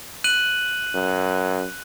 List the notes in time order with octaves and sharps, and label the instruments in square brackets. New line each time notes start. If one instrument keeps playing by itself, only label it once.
[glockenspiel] F#6 D#7 F#7
[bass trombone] F#2